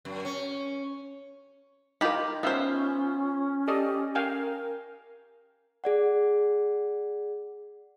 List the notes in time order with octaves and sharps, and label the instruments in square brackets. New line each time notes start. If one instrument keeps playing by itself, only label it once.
[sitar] F#2
C#4
[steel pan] D#4 F4 A#4 [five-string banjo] G4 B5
[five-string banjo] B3 C5 [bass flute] C#4 [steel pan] D#4 E5 F5 [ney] F4
[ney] G4 [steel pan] A4 D5 D#5
[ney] A#4 [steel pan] F5 G5 G#5
[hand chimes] G#4 D5 F#5